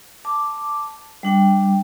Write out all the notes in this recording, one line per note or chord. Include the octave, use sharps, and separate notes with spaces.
A5 D6
G3 D4 G5